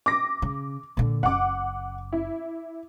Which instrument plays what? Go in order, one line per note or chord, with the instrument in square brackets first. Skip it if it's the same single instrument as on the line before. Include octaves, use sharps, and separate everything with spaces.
[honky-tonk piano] D6 A#6
[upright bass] C#3
A#2 D3
[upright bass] F#1 [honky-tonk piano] F#5 D6
[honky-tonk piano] E4